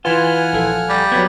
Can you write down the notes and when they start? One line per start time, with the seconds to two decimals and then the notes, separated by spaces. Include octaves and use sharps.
0.05 E3 F4 B4 F#5 G#5 F6
0.53 A#1 A4 F5
0.89 G3
1.12 F#3 B3 G#6